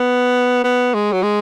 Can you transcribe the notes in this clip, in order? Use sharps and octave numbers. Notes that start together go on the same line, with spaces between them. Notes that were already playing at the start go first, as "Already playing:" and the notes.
Already playing: B3
B3
G#3
F#3
G#3